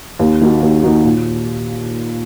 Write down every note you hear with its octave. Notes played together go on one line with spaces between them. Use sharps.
D#2
D#3 A#3 D#4 F#4
D#2
D#3 A#3 D#4 F#4
A#2